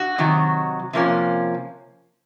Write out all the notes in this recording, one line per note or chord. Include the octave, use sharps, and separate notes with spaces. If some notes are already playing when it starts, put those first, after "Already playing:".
Already playing: F#4
C3 D#3 F#3
C3 F3 A#3 C#4